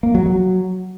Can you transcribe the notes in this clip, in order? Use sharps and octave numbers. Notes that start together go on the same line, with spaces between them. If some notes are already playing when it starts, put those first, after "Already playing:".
A#3
F#3
F#3